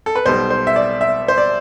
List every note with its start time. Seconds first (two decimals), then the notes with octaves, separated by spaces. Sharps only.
0.06 A4
0.16 B4
0.26 B1 B2 G3 C5
0.50 C5
0.67 E5
0.76 D5
1.01 E5
1.28 C5
1.38 D5